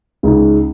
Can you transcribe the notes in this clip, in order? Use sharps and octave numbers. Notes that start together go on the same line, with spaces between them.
C#2 C#3 G#3 D#4